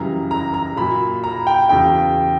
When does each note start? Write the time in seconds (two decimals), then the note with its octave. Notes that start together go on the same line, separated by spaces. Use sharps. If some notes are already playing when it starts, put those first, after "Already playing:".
Already playing: F#2 C#3 E3 G3 A#5
0.31 A#5
0.54 A#5
0.77 A#2 F#3 B5
1.24 A#5
1.47 G5
1.69 E2 C#3 F#3 G5